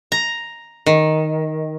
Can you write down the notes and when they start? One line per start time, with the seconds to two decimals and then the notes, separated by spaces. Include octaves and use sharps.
0.12 A#5
0.86 D#3